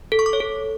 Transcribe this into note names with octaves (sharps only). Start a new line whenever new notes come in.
A4
C#6
D6
C#5
A4